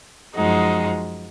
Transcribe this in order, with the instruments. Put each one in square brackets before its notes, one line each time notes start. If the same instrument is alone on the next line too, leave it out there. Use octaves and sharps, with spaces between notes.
[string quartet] F#2 F3 G#3 D#4 F#4